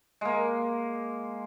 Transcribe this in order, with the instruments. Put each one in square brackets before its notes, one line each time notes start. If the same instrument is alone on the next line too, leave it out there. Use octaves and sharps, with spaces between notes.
[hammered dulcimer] G#3 A#3